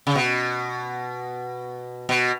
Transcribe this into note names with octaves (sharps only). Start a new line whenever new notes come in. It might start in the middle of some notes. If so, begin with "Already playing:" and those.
C#3
B2
B2